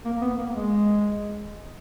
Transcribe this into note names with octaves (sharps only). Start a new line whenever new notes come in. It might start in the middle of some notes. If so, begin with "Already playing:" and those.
A#3
B3
A#3
G#3